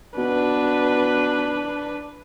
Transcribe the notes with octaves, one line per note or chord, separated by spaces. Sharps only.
B2 D4 B4